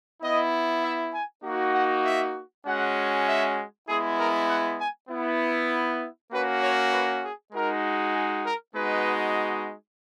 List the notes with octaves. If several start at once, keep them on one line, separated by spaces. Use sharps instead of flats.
B3 E4 D#5
E5
G#5
A#3 D#4 F#4
F#5
E5
G#3 C#4 F#4 F#5
E5
G#3 B3 E4 G#4
A#4
F#5
G#5
B3 E4
A#3 C#4 F#4 B4
C#5
B4
G#4
G#3 D#4 F#4 A#4
G#4
A#4
G#3 B3 D#4 F#4 B4